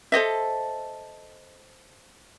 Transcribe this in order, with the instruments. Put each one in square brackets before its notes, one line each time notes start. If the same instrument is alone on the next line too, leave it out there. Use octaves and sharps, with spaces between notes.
[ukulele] A4 C5 D#5 E5